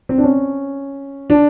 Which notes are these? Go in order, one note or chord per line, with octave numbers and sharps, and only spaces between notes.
C4
D4
C#4
D4